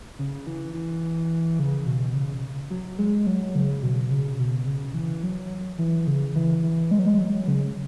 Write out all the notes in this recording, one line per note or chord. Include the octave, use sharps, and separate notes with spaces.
C#3
E3
E3
C#3
B2
C#3
F#3
G#3
F#3
C#3
B2
C#3
B2
C#3
E3
F#3
E3
C#3
E3
E3
G#3
F#3
G#3
F#3
C#3